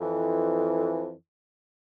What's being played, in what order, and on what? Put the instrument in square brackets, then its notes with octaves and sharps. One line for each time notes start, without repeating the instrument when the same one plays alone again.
[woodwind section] F2 E3